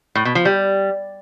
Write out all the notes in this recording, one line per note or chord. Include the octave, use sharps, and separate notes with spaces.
A2
B2
F3
G3